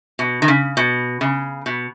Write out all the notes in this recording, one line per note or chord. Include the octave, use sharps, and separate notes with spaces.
B2
D#3
C#3
B2
C#3
B2